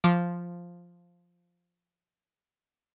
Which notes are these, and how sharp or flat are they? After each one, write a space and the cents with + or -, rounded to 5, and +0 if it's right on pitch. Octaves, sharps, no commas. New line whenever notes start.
F3 +0 D6 -10